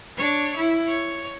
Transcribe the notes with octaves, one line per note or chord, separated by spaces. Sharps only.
D4 C#5
E4
C#5